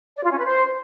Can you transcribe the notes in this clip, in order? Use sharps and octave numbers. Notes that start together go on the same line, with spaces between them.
D5
F4
C#4
B4
C5